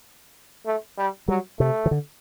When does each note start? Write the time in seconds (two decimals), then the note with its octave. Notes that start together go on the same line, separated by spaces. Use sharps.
0.66 A3
0.98 G3
1.28 F#3 G3
1.60 C3 A3
1.86 D#3
1.91 D3